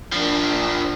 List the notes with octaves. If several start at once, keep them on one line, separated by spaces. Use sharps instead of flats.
F3 D4